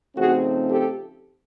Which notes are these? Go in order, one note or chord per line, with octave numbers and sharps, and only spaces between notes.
C#3 F3 A3 C4 D#4 F#4 G#4
G4 A4